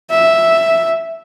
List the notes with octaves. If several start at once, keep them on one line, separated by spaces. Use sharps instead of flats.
E5